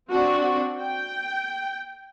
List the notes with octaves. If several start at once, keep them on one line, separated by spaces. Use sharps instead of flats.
C4 D4 F#4
G5